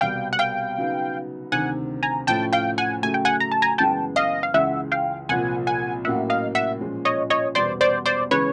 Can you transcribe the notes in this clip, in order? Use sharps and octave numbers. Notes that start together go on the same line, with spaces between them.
C2 B2 G3 F5 G5
F#5
F5 G5
C#3 F#3 B3 D#4
D2 C3 D#3 F#5 G#5
G#5 A#5
A2 F3 A3 C#4 G5 A5
F5 G5
F#5 G#5
C#3 F#3 A3 G#5
G5
F#5 G#5
A#5
A5
G#5 A#5
F#2 C#3 E3 G#3 B3 G5 A5
D#5 F5
F5
C#2 C#3 E3 G#3 E5 F#5
F5 G5
C2 A#2 F3 F#5 G#5
F#5 G#5
A2 F#3 A#3 C#4 E5 F#5
D#5 F5
E5 F#5
A#2 F3 G#3 C#4
C#5 D#5
C#5 D#5
E2 B2 G3 B3 C5 D5
C5 D5
C5 D5
C#3 E3 G#3 C#4 B4 C#5